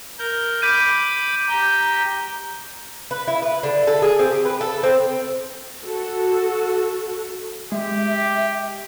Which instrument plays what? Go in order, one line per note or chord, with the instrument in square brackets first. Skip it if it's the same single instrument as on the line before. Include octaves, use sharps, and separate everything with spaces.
[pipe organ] A#4 G6
[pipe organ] B5 D6 [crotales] G6 D#7
[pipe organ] G4 G5 [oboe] A#5
[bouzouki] B4
E4
B4
D3
A4
G#4
C4
G4
B4
A4
C4
[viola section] F#4 A4
[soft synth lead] G#3 [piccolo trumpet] G4 [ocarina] E5